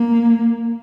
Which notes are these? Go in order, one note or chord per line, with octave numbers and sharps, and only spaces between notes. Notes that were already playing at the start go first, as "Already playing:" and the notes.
Already playing: A#3